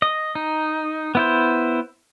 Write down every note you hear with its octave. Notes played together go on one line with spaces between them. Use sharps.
D#5
D#4
B3 E4 C5